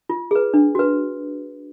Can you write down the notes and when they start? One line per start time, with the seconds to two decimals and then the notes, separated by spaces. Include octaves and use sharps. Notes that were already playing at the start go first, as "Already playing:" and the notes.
0.09 F4
0.31 G#4 B4
0.54 D4
0.75 F#4 B4